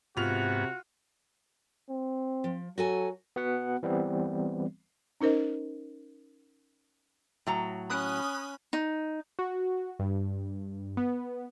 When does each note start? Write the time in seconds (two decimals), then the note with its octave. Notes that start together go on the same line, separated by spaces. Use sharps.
0.17 G#2 C3 B3 F4 F#4 F7
1.90 C4
2.44 F3
2.78 F#3 F#4 A4 G#5
3.36 B3 F#4 F#5
3.83 E3 G3 B3 C4
5.21 C#4 D#4 A#4 C5 D#5
7.47 A2 F#3 A#5
7.90 C#4 B5 D#6 F#6
8.73 D#4
9.39 F#4
9.99 G2
10.97 B3